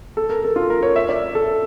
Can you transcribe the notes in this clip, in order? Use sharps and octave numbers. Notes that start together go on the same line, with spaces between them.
A4
A#4
A4
F4
A#4
C#5
E5
D5
A4